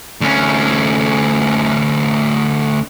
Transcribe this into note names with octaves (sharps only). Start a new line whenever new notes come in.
D2 C#4